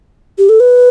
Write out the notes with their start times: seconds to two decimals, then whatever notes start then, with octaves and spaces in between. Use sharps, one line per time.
0.38 G4
0.49 A4
0.60 B4